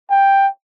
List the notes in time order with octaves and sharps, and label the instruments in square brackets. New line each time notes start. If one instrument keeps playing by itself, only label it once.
[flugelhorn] G5